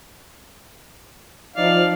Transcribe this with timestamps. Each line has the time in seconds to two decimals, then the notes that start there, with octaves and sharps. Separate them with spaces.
1.57 F3 D#4 D5 F5